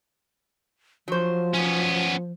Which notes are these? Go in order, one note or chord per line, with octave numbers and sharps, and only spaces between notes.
F3 F#3 C5
B3 C#4